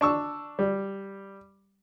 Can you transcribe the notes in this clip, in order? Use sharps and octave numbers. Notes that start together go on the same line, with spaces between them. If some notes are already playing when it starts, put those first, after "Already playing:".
D4 C#6 E6
G3